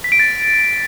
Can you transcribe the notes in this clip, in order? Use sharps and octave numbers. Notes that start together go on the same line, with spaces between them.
B6
D7
A6